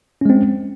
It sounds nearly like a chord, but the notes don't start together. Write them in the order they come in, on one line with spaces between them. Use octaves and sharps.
C#4 G#3 C4